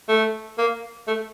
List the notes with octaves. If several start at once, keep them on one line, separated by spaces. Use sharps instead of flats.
A3
A#3
A3